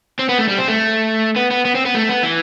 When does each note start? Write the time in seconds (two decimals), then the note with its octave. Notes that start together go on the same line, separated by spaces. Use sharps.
0.19 C4
0.29 B3
0.38 A3
0.48 G3
0.58 C4
0.68 A3
1.36 B3
1.51 B3
1.65 B3
1.75 C4
1.85 B3
1.95 A3
2.09 B3
2.23 E3